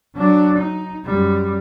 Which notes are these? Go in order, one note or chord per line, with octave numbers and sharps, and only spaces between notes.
F#3 D4
D#4
F#2 G3